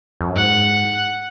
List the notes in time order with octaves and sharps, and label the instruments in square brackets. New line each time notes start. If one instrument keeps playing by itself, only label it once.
[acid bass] F2
F#2
[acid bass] G#2 [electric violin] F#5